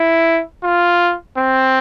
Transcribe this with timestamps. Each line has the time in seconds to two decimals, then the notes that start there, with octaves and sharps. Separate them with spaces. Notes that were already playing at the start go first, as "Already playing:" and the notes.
Already playing: E4
0.64 F4
1.37 C4